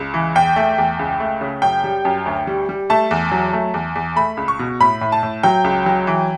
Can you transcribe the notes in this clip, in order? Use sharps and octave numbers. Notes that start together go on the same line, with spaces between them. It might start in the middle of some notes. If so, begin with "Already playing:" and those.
Already playing: C#2
E3
E2 G5
A3
E2
C#2
A3
C#3
F#2 G5
G3
F#2
D2
G3
G3
A3 A5
E2
F#3
A3
E2
E2
A3 B5
C#2
C#6
B2
A2 B5
A2
A5
A2
F#3 G5
C#2
F#3
E3